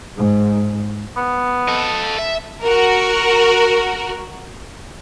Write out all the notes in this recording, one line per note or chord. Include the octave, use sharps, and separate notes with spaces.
G#2
B3
A4 D#5
E5
F#4 A#4